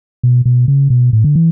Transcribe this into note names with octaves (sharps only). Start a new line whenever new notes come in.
B2
B2
C#3
B2
A2
D3
E3